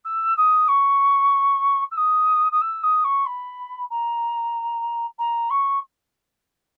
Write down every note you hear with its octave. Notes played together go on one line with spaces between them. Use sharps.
E6
D#6
C#6
E6
D#6
D#6
E6
D#6
C#6
B5
A#5
A#5
C#6